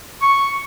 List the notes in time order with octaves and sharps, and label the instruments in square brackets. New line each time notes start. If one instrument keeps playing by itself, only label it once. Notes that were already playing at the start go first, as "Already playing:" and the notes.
[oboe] C#6